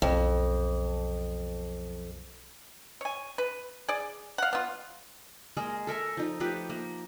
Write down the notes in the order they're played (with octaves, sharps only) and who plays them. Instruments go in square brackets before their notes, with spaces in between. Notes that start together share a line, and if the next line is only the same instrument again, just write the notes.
[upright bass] B1 [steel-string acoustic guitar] F2
[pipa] C#5 G#5
B4
G#4 D5
F5 F#5
B3 F4
[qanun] G#3 A#3 G#4 A#4
A4 A#4 E5 G#5
F3 D#4
F3 A3 G4 B4
A#3